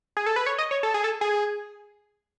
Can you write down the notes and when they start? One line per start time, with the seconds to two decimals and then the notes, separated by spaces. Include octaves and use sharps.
0.17 G#4
0.26 A4
0.36 B4
0.46 C#5
0.58 D#5
0.71 C#5
0.83 A4
0.94 G#4
1.04 A4
1.21 G#4